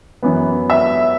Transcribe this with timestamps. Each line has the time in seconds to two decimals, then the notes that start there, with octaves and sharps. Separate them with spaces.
0.23 F#2 E3 B3
0.70 E5